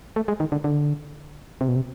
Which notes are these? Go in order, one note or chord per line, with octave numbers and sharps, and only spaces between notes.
A3
G#3
D#3
D3
D3
C3
B2
C3